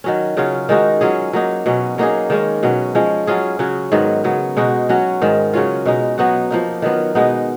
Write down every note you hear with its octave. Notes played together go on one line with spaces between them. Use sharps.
D#3 F#3 C#4
C#3 F#3 C#4 F4
D#3 G#3 D#4 F#4
F#3 C#4 F4 G#4
F#3 A#3 D#4
B2 F#3 C#4
F#3 A#3 D#4 G#4
D#3 G#3 C#4
B2 F#3 C#4
F3 G#3 C#4
F#3 C#4 F4 G#4
C#3 F#3 C#4 F#4
G#2 D#3 F#3 B3
C#3 F#3 B3
B2 G#3 D#4 F#4
F#3 C#4 F#4
G#2 D#3 G#3
C#3 F#3 C#4 F4
B2 G#3 D#4
F#3 B3 D#4 F#4
F3 A#3 D#4
D#3 F#3 B3 F4
B2 G#3 B3 D#4